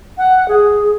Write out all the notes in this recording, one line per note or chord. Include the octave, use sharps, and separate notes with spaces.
F#5
G#4